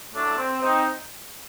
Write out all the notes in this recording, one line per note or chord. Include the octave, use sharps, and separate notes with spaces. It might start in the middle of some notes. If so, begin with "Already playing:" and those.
A2 F#3 A3 D4
C4
C4 D#4